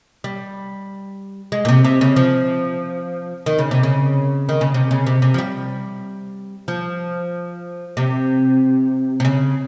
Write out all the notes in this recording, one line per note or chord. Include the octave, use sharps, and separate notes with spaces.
G3
G#3
A#2
C3
C3
C#3
F3
D#3
C#3
C3
C#3
D#3
C#3
C3
C#3
C3
C3
F3
G3
F3
C3
C3
C#3